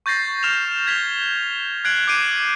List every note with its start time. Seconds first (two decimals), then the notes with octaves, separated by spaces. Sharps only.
0.06 C#6 G6 A6 A#6 C7
0.43 C#6 F6 E7 F7
0.87 G#6 B6 F7 G7
1.85 F#6 G#6 C7 D7 F#7
2.07 D6 G6 C7 D7 D#7